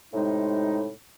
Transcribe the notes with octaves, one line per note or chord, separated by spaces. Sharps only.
A2 C3 G#3 D#4